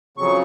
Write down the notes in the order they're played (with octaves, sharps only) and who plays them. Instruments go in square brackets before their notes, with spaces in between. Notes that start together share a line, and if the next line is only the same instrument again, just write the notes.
[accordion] F2 C#3 F#3 C#6